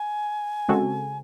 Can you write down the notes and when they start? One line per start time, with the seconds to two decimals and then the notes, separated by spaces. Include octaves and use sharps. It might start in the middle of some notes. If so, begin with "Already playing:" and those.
Already playing: G#5
0.69 C#3 G#3 C4 F#4 A4